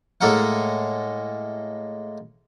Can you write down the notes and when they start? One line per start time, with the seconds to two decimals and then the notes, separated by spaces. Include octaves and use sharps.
0.21 A2 G#3 A#3 A4 A#4 F#5